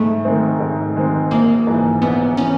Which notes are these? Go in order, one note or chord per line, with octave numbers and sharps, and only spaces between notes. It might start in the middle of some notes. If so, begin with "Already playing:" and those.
Already playing: G#2 A3
D#3 G#3 C4
G#2
D#3 G#3 C4
A#1 A#3
G#2 E3
A#1 B3
E3 C#4